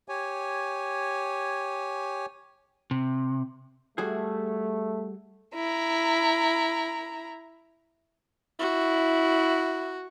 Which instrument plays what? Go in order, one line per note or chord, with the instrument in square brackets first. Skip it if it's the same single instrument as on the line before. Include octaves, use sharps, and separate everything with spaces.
[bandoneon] G4 C#5 G#5
[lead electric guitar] C3
[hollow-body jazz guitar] G3 F#4 G#4 [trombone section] A3
[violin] E4 A#5
[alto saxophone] E4 [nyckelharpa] F#4